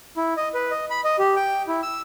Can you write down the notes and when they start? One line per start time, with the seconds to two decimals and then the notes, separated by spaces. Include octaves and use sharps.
0.17 E4
0.37 D#5
0.54 B4
0.71 D#5
0.90 B5
1.04 D#5
1.19 G4
1.36 G5
1.68 E4
1.83 E6